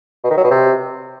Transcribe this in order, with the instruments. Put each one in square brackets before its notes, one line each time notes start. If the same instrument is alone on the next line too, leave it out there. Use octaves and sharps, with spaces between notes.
[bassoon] B2
D#3
F#3
B2
C3